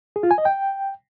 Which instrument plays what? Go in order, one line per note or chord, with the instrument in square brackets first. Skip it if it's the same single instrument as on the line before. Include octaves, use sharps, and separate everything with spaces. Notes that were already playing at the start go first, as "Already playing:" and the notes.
[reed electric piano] G#4
F4
G#5
D#5
G5